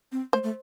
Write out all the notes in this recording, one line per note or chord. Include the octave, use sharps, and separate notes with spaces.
C4
A3 C5
A3